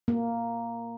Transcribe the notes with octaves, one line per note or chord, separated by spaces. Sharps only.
A#3